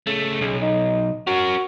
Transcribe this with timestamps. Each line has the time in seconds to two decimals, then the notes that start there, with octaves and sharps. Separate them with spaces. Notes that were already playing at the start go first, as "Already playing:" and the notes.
0.07 C#2 C#3 A3
0.41 B1 C#3
0.62 D#4
1.27 C#4 F#4 A#4